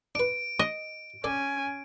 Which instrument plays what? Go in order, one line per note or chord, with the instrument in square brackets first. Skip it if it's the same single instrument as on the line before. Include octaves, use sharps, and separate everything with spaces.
[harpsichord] D4 B4 [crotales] D7
[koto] D#5
[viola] C#4 G#5 [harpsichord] A4 D5